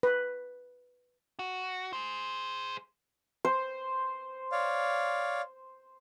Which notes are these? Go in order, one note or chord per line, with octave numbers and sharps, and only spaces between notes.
B4
F#4
G#4 C5
C5
C#5 D5 F5